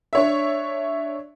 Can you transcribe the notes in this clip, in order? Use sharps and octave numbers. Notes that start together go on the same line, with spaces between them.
D4 C#5 E5